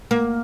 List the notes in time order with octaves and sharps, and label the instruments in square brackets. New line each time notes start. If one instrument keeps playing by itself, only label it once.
[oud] A#3